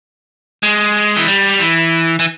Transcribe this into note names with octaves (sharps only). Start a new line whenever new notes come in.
G#3
E3
G3
E3
E3